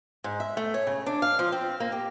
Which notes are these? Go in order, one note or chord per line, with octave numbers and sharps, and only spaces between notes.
G#2
E5
A3
C#5
C#3
D4
F5
F3
C4
A#3
G4